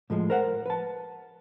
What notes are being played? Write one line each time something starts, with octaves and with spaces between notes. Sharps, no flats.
A2 F3 G#3
A#4 C5 F#5
B4 A5